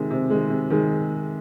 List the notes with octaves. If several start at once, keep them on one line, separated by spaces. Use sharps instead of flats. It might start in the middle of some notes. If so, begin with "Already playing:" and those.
Already playing: C3 D#3 G#3
C3
D#3 G#3
C3
D#3 G#3